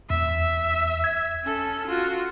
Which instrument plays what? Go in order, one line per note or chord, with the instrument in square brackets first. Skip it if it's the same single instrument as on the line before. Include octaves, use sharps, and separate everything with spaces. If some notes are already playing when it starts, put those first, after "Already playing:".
[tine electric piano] E2 [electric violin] E5
[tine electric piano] G#6
[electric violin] C#4 A4
F4 F#4